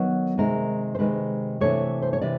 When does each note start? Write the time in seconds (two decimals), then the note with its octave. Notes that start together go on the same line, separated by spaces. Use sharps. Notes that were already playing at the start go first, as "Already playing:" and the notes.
Already playing: D#3 F#3 B3
0.37 C3 D#3 G#3 A#4
0.95 C5
0.99 C3 D#3 G#3 B4
1.61 C3 E3 A3 D4 C#5
2.02 C5
2.13 C#5
2.21 C3 E3 D5